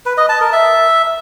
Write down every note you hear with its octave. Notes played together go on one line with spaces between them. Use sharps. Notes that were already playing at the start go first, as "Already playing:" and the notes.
B4
D#5
A5
A#4
E5